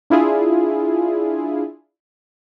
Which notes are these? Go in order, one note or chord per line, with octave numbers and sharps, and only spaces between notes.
D4 E4 F4 G#4